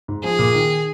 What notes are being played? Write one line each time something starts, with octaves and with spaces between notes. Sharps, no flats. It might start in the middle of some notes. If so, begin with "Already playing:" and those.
G#2
F3 G#4
A#2
D#3